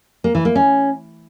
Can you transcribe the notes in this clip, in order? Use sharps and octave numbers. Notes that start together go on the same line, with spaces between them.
A#3
E3
A#3
C#4